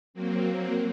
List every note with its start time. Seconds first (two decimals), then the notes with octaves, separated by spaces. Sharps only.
0.14 F#3 A#3 C4